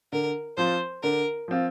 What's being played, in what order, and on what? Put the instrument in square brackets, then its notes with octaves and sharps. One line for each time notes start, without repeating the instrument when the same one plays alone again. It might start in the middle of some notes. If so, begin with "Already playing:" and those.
[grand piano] D3 [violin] A#4
[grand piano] F3 C4 F4 [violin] C5
[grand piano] D3 [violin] A#4
[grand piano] F3 C4 F4